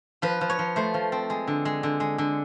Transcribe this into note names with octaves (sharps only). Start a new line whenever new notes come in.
F3 B4
F3
C#5
F3
A3 C5
F3
C4
G#3
D3
G#3
D3
G#3
D3